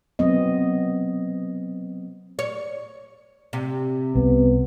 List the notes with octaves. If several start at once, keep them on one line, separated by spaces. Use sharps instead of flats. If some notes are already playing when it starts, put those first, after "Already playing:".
F#3 B3 C4 D#5
C#5
C3
C2 B3